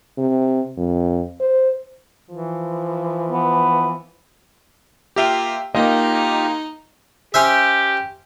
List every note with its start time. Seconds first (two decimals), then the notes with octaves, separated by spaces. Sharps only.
0.18 C3
0.77 F2
1.40 C5
2.30 E3 F3
3.30 B3
5.16 A#3 F4 G4 E5 G5
5.75 A#3 D#4 F4 G4 D#5
7.34 C#4 G4 C5 E5